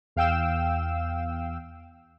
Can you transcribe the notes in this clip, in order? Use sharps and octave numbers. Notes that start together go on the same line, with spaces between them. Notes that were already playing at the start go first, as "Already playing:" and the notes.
E2 F5 G5 E6 E7